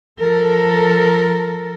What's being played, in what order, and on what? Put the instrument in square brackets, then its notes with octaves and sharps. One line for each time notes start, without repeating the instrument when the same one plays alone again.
[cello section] F3 A4 A#4